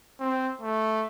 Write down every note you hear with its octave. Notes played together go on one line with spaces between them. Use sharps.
C4
A3